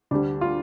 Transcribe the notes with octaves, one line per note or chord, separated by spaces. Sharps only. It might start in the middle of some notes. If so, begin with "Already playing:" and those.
D2 D3 G3 D4
F4